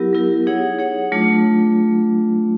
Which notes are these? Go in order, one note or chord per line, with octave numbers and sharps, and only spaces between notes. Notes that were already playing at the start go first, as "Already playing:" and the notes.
Already playing: F#3 B3 E4 G4 A#4
F#3 B3 E4 G4 A#4
D#4 G#4 C#5 F#5
D#4 G#4 C#5 F#5
F#3 A3 D4 F4